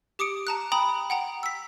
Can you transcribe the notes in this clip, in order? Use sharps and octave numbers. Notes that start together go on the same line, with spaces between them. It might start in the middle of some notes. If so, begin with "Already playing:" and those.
G4 D6 D#6 C#7 D7
A5 A#5 F#6
G5 A#5 B5 D#6
F#5 G5 A#5
E6 B6